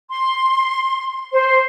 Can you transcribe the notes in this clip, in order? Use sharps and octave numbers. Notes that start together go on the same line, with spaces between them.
C6
C5